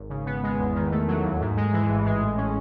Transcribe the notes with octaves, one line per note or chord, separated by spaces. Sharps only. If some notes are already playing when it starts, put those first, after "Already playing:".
Already playing: G#1
C#3
B3
G#3
E2
D#3
A3
F#3
D#2
G#2
G#3
E3
A1
G#3
A2
C#4